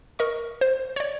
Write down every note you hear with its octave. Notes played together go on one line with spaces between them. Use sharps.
A#4 D#5 C#6
C5
C#5 D5